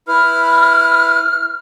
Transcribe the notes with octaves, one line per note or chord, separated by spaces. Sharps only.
E4 B4 F6